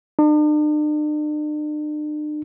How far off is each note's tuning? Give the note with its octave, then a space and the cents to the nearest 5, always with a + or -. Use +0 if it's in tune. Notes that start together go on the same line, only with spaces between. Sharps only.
D4 +45